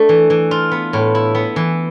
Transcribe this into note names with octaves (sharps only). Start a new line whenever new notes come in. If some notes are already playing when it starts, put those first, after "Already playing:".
Already playing: A3 D4
E3
E3
F4
B3
A2
E4
B3
E3